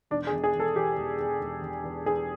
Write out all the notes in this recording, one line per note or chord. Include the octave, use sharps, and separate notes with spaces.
E1 D4
G#4
E1
G#4
E1
A4
E2 G4
E1
E2
E1
E1
E2
E2 G#4